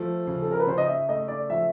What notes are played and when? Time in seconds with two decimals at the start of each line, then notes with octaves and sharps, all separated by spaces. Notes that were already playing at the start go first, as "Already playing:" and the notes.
Already playing: F3 A3
0.27 C#3
0.42 A4
0.52 A#4
0.60 B4
0.67 C#3 C5
0.78 D#5
0.88 E5
1.08 A3 D#5
1.28 D5
1.50 F3 E5